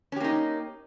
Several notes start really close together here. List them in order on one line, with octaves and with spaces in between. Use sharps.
C#4 G4 A#3 D#4